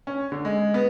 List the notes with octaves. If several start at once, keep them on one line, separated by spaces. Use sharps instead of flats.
C#4
D3
G#3
B3